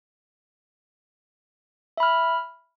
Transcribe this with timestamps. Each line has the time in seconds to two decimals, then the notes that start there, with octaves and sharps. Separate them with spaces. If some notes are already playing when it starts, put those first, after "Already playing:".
1.97 E5
2.00 B5
2.03 F6